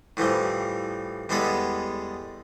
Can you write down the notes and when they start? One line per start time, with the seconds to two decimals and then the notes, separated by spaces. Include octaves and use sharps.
0.17 A2 E3 F3 G3
1.29 E2 G3 G#3 B3 A4 B4